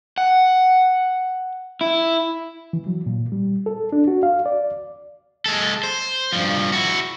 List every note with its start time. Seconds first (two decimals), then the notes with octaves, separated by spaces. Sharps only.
0.18 F#5
1.81 E4
2.73 E3
2.87 F#3
3.06 A#2
3.32 G3
3.66 A4
3.93 D4
4.08 F#4
4.23 F5
4.46 D5
5.46 G#3 A4
5.83 C5
6.33 G2 F3
6.72 E4 F#4